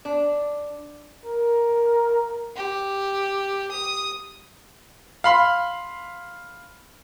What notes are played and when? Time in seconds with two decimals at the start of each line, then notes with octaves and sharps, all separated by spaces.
0.05 D4
1.26 A#4
2.57 G4
3.72 D#6
5.24 F5 B5 C6